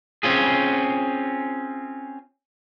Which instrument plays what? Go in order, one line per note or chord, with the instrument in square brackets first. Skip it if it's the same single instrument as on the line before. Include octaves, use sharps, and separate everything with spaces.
[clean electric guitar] C4 C#4 F4 G#4